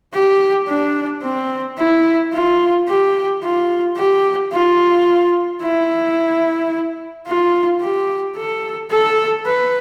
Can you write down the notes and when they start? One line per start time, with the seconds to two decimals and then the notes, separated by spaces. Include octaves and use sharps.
0.14 G4
0.68 D4
1.23 C4
1.78 E4
2.33 F4
2.88 G4
3.43 F4
3.97 G4
4.53 F4
5.62 E4
7.27 F4
7.81 G4
8.37 A4
8.91 A4
9.46 B4